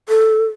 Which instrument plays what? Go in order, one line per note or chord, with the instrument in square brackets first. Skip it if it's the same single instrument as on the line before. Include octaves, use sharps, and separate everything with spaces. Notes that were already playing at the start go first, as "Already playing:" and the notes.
[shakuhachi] A4